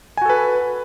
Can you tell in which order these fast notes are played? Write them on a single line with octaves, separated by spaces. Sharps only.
G#5 F#4 A4 B4